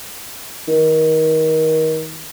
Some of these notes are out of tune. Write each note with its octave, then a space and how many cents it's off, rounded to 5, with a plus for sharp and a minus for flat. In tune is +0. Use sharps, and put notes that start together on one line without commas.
D#3 +25